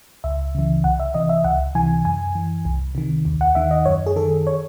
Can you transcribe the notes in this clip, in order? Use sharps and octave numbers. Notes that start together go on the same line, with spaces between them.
C#2 E5
C#3 E3
C2 F#5
E5
C3 E3 D#5
E5
C#2 F#5
C3 E3 G#5
F#2 G#5
E3
C2
C3 D#3
D#2
F#5
D#3 E5
D#5
F#2 C#5
G#4
D#3 A4
C#5